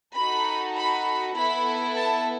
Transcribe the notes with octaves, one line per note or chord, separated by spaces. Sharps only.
D#4 F#4 A4 B5
B5
B3 E4 A4 B5
A5